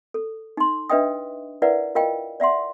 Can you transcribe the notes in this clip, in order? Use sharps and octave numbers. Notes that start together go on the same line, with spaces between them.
A4
D#4 C6
D4 B4 D#5 E5 G5 D#6
E4 A#4 B4 D5 E5 F#5
F4 A#4 D#5 F5 G5
D5 E5 F#5 C6